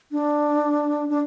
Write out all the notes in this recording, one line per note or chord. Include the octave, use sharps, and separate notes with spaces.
D4
D4